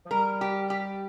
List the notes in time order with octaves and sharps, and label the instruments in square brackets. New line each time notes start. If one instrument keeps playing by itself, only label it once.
[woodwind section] F3
[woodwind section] G3 [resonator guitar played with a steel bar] A#4
[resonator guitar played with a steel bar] G4
G4